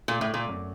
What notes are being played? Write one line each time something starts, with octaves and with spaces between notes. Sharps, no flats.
A#2 A3
A2
A3
A#2
F#2